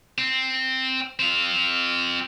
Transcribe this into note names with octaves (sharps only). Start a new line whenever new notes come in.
C4
C4 F4